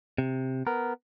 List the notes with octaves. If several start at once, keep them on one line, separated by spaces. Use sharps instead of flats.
C3
B3 A#4